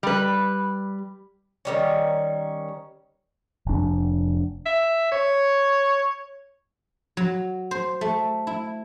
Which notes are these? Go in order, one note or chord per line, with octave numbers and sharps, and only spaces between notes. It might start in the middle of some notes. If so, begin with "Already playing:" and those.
G3 B4
D#3 G3 C#4
F1 D4
E5
C#5
F#3
C5
A3
E4